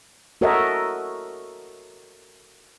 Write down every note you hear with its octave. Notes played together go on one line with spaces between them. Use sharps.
F#4 A4 A#4 C#5 D#5 E5